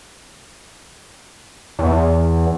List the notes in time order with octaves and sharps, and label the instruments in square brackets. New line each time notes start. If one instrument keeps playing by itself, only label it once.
[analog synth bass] E2